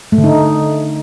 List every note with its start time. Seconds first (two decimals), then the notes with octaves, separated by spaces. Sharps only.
0.12 A3
0.18 D3
0.24 D#4